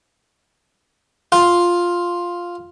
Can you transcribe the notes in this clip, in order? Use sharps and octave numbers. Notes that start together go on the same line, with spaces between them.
F4